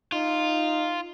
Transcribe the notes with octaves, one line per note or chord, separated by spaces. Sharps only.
D#4 F4